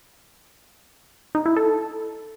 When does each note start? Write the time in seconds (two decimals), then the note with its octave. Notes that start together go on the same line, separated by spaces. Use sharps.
1.35 D#4
1.46 E4
1.56 A4